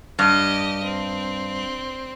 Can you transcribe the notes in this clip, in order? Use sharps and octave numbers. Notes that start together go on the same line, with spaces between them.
G2 G4 D#5
C4